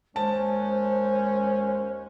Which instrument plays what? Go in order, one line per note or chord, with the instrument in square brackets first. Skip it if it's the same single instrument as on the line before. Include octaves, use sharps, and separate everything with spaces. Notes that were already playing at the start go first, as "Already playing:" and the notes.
[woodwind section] D#2 G#3 [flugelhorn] C#4 [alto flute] C5 [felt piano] A5